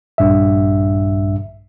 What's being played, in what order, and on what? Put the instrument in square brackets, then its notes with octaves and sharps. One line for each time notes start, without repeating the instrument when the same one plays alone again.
[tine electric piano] A#1 G2 E5